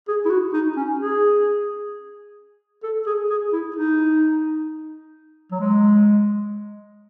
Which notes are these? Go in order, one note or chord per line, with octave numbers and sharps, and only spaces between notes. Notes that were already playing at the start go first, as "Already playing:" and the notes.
G#4
E4
F#4
D#4
C#4
G#4
A4
G#4
G#4
E4
D#4
F#3
G#3